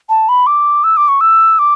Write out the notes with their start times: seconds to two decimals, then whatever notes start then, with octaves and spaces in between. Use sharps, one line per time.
0.09 A5
0.29 B5
0.47 D6
0.84 E6
0.97 D6
1.08 C#6
1.21 E6
1.59 D6